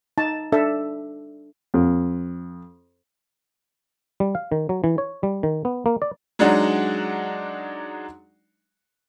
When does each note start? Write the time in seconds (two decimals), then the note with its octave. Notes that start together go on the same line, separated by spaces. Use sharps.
0.18 D#4 A5
0.52 D4 A4 E5
1.74 F2
4.20 G3
4.35 F5
4.52 D#3
4.69 F#3
4.84 E3
4.98 C#5
5.23 G3
5.43 D#3
5.65 B3
5.86 A#3
6.02 D5
6.39 F#3 G#3 D4 D#4 D5 F#5